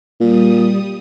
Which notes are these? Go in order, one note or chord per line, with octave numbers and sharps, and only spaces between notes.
A#2 G3 D#6